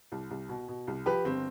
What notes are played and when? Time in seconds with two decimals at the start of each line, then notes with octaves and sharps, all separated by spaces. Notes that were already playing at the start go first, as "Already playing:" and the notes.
0.12 C2
0.31 C2
0.49 B2
0.68 B2
0.87 C2
1.06 F3 G4 B4
1.25 G1 C4